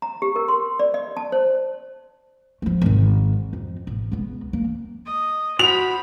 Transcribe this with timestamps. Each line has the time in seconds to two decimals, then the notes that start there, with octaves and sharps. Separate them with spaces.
0.02 A#5
0.22 G4
0.36 A#4
0.48 C6
0.79 D5
0.94 D#5
1.17 A5
1.32 C5
2.62 F3 A3
2.82 G#1 D#3
3.53 F2
3.87 A1
4.12 C#2 B3
4.53 A#3
5.07 D#5
5.59 F#4 C5 B5 F7